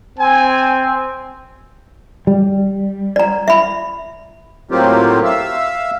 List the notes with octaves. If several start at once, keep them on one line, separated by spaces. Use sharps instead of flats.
C4 G#5
G3
D5 A#5
E5 B5
A2 F#3 A#3 C4 F4 G4
E5 F5 E6